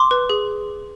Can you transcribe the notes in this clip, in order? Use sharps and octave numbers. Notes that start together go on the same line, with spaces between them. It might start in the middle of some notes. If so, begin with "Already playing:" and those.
Already playing: C6 D6
B4
G#4